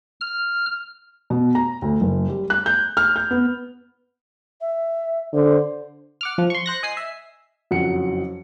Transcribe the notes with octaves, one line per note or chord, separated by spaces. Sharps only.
F6
B2
A#5
D2
F#1
G3
F#6
G6
F6
G6
B3
E5
D3 C5
F#5 D6 F6
F3
C6 C#6
C5 F#6 A#6
D#5 G#5 D#6 C7
E5
F#1 F2 F#3 F#5 C#7